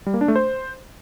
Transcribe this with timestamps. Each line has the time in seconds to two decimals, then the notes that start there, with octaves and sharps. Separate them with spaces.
0.06 G3
0.14 A#3
0.21 D4
0.28 A3
0.36 C5